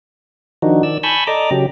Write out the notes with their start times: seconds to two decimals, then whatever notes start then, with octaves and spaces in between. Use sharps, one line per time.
0.62 D#3 F3 D4 D#4 F#4
0.83 D#3 D5 E6
1.03 G#5 A5 B5 C#6 E6 G6
1.27 A4 D5 D#5 A#5 D6
1.51 C#3 F#3 G4